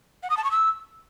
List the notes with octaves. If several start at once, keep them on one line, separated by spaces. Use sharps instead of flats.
F#5
D#6
A5
C#6
E6